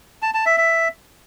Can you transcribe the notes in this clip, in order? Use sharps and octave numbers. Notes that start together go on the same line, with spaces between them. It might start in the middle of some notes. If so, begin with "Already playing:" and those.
A5
A5
E5
E5